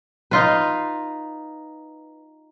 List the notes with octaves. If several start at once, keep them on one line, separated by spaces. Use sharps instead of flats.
D#4 F4 B4